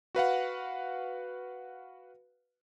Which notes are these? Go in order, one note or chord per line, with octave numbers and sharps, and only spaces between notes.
F#4 B4 F5 F#5